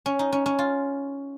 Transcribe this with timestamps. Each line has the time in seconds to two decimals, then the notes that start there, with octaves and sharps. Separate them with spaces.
0.06 C#4
0.19 D#4
0.32 C#4
0.46 C#4
0.59 F4